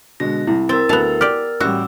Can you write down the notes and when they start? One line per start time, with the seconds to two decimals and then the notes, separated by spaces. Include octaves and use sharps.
0.20 B2 D3 G#3 A#6
0.47 C2 E4
0.69 C4 A#4 E6 A6
0.89 D2 B3 A4 A5 F7
1.21 G4 D5 F6
1.60 A1 G3 F#4 D6 E6